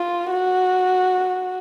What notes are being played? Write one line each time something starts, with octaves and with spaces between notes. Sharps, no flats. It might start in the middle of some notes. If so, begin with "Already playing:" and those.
Already playing: F4
F#4